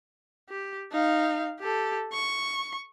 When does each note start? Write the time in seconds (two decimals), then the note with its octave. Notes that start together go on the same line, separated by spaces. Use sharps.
0.50 G4
0.92 D#4 F5
1.60 G4 A4
2.12 C#6